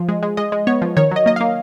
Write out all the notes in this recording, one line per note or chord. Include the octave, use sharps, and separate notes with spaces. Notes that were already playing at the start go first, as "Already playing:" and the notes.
Already playing: F3 F4
G#3
G#3
G#3 D#5
G#3
B3 C#5
F3
D#3 C#5
F#3 D#5
A#3 D#5
A#3 F5